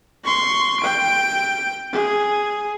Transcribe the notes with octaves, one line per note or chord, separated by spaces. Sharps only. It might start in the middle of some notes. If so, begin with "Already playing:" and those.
C6 C#6
G5 D7
G#4